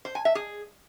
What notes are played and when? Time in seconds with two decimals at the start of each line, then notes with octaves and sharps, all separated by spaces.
0.05 C5
0.15 G#5
0.25 E5
0.35 G#4